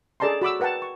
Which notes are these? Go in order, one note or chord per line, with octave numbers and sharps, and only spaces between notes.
G#4 A4 D5 A5 A#5 C6
F#4 B5 D6 E6
A#4 B4 F#5 G5 A5
C#6